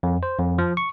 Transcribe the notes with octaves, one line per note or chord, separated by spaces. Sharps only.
F2
C5
F2
F3
C#6